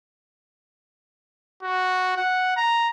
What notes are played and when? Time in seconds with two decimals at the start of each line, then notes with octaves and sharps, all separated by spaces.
1.63 F#4
2.17 F#5
2.57 A#5